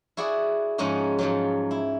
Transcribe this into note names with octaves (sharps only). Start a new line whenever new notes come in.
E4 F#4 G#4 D5 F#5
G#2 F3 G#3 C#4 D#4 F#4
G#2 F3 F#3
E4